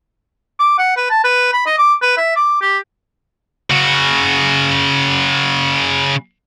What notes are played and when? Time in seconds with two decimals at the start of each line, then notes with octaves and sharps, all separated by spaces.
0.59 D6
0.78 F#5
0.97 B4
1.10 A5
1.24 B4
1.53 B5
1.66 D#5
1.78 D6
2.02 B4
2.17 E5
2.36 D6
2.61 G4
3.70 C#3 F#4